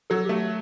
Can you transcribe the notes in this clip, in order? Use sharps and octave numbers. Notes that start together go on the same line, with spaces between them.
F#3 A4
A3 G4